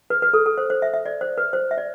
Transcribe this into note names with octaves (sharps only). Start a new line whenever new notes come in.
B4
B4
A4
A4
C5
C5
E5
E5
D5
C5
B4
C5
E5
D5